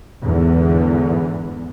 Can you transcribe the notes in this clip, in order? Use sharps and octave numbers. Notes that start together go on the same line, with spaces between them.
E2 G#2 D3 E3 B3